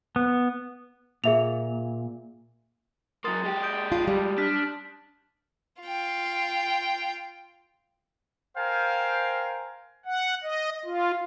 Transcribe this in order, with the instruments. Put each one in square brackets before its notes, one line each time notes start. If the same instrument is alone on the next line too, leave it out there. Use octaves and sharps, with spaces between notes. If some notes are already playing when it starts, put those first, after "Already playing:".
[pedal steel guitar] B3
[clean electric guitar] A#2 [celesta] G#4 E5 F7
[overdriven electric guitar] F#3 A#3 [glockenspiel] C6 D#6 A6
[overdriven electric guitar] G#3 G4
[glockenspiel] D#6 G6 D7
[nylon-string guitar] F4 [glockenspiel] A5
[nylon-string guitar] G3
[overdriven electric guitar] D4 [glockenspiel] A5 F6 B6
[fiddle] F4 G5
[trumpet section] A#4 C5 F5 G5 G#5
[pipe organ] F#5
D#5
F4